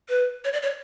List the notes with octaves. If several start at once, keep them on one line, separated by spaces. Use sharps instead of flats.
B4
C#5
D5
C#5